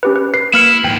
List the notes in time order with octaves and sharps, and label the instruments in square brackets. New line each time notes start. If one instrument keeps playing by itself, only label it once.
[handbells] C#4 G4 B4
B4
B4 C7
[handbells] A#3 F6 C#7 [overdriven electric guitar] E4
[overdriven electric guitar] D#2 G#2 [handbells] G5